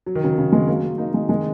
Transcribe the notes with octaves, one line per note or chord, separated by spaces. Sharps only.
F#3
D#3
C#3 F#3
C#3 F#3
D#3 G#3
F#3 A#3
A#3 D#4
D#3 G#3
D#3 G#3